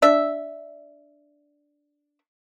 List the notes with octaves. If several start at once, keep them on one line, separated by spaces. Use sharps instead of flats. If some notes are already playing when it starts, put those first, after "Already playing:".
D4 E5